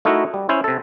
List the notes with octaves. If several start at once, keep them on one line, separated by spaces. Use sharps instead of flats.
A3 D#4 E4 F#4 A#4
G3
C#4 E4 C5
C3 A4